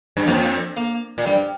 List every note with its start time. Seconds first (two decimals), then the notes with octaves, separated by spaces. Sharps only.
0.17 G2
0.27 F2 A#3
0.77 A#3
1.18 A#2
1.26 G2 G3